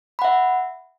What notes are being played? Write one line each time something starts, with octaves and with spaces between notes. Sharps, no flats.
E5 F#5 B5